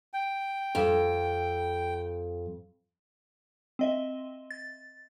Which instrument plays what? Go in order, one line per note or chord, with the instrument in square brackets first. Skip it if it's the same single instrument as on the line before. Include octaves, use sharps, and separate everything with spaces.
[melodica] G5
[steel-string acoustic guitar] F2
[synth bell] C4 D#5 E5
A6